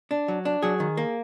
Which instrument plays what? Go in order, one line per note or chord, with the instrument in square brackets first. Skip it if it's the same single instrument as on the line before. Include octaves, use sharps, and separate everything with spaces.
[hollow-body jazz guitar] D4
F#3
D4
F#3 G#4
D#3
A#3